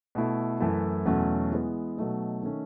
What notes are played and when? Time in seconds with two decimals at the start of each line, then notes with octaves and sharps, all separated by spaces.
0.15 B2 A3 E4
0.60 F#2 E3 A3 E4 A4
1.06 E2 B2 F#3 A3 C#4
1.52 E3 G#3 B3
1.97 B2 F#3 A3 D#4
2.42 D#3 A3 C#4